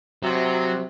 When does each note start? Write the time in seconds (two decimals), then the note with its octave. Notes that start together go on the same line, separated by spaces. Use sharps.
0.23 C3 F#3